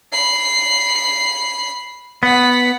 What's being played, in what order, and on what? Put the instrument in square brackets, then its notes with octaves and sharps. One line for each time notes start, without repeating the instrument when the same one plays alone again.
[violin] B5 C7
[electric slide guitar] B3 [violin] F#5 B6